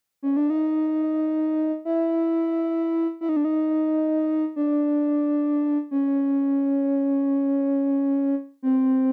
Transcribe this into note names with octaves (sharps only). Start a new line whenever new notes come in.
C#4
D4
D#4
E4
E4
D#4
D4
D#4
D4
C#4
C4